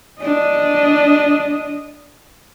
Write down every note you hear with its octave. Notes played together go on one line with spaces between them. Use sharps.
D4 D#5